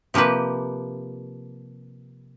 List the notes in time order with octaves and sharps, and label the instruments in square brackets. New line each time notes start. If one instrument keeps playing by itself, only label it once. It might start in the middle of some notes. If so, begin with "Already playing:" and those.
[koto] C3 F3 A#3 G4 B4